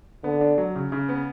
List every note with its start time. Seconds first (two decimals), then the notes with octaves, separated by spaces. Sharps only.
0.23 D3 B3
0.41 D4
0.58 F#3
0.75 C#3
0.92 C#3
1.09 B3